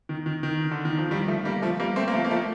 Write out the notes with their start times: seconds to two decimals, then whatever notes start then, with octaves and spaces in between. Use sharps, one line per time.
0.09 D#3
0.26 D#3
0.43 D#3
0.71 D3
0.85 D#3
0.98 F3
1.11 D#3 G3
1.28 F3 A3
1.45 G3 A#3
1.62 F3 A3
1.80 G3 A#3
1.96 A3 C4
2.08 A#3
2.13 F3 A3
2.25 A#3
2.30 F3 A3